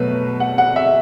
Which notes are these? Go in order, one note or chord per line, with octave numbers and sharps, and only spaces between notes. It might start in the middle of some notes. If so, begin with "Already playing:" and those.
Already playing: B2 F#3 A3 B4
F#5
F#5
E5